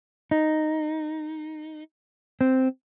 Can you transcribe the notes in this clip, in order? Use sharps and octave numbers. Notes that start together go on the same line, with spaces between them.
D#4
C4